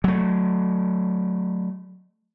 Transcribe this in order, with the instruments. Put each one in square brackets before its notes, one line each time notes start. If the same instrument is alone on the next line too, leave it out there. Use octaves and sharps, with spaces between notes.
[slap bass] F#3 A3